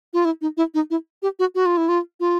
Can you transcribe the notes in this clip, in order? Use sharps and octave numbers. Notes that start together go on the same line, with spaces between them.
F4
E4
D#4
E4
D#4
E4
G4
F#4
F#4
F4
E4
F4
F4